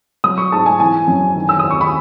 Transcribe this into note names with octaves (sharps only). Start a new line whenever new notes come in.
F#3 D#6
C#6
G#2 A5
G#5
E3 G#5
F#2
D#3
E6
D#2 D#6
C#6
B5